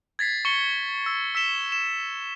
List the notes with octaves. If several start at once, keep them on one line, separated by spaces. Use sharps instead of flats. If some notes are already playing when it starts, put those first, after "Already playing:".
G#6 A6 B6 C7
C#6 C#7 G7
E6 A6
E6 B6 E7 G7
E7